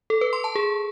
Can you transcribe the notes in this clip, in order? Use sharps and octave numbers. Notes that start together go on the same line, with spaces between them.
A4
B4
C6
A5
G#4